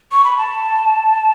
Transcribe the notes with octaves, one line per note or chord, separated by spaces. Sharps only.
C#6
B5
A5